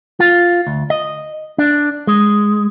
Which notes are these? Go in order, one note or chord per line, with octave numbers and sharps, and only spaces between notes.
F4
D2
D#5
D4
G#3